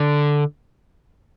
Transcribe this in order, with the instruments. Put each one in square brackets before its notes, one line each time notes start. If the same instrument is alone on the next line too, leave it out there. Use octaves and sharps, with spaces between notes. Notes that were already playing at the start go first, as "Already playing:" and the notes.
Already playing: [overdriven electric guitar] D3